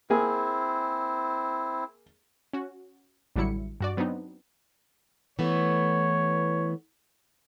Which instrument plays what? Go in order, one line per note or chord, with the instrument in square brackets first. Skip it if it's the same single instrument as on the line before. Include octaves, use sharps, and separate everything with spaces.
[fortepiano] A#3 G#4 G#5 [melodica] C4 E4
[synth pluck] C#4 F#4
A1 D3 F#3 G3 E4 C#7
G2 F#4 D5
F#3 B3 C4 D4 D#4
[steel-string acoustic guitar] E3 A3 B3 [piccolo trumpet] C#5